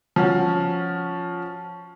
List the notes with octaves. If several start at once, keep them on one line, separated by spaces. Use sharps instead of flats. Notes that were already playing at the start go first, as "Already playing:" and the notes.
F3 C#4 F#4